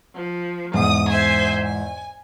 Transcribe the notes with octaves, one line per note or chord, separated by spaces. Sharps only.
F3
E2 G#2 D#6
C5 E5 G#5
G#5